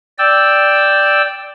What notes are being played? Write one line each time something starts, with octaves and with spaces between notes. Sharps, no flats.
D5 G5 E6